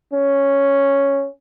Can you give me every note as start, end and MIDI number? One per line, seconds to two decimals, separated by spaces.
0.13 1.29 61